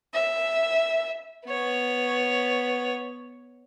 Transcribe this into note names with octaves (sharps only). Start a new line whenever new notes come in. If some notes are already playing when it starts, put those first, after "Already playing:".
E5
B3 C#5